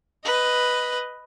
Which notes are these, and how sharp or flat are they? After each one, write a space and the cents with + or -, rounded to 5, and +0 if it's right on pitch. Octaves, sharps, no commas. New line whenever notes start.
B4 +5 D#5 +0